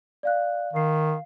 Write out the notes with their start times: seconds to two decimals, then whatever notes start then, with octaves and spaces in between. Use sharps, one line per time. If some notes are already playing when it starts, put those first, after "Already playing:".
0.23 D5 F5 F#6
0.73 D#3 F5 C7